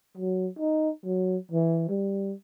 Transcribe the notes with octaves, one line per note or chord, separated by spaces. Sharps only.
F#3
D#4
F#3
E3
G3